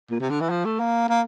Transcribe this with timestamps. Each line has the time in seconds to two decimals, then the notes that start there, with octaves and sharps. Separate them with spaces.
0.11 A#2
0.20 C3
0.30 D3
0.41 E3
0.49 F3
0.65 A3
0.79 A#3
1.08 A#3